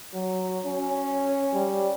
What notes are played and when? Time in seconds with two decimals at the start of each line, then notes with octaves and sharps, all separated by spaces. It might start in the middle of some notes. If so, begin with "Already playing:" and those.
0.14 F#3
0.66 C#4
1.54 G3